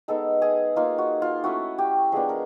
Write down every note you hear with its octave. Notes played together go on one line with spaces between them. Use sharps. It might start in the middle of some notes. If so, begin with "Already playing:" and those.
G#3 B3 D#4 A4
G#4
A#3 D#4 F4
F#4
F4
A3 C#4 E4 F#4
G4
F3 G#3 B3 D4 G#4
A#4